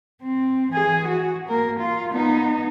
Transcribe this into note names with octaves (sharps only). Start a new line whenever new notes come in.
C4
E3 G#4
F#4
A#3 A#4
F4
B3 D#4